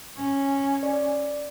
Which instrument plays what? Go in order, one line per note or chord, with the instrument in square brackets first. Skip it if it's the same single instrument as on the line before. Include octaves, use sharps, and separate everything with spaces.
[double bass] C#4
[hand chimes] D5